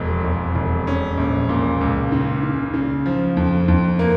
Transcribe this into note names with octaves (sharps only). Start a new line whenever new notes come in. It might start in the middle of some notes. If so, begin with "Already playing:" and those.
Already playing: E1 F2
E1
E1
C#4
A#1
A#2
C#2
C#3
C#3
C#3
F3
F2
F2
A#3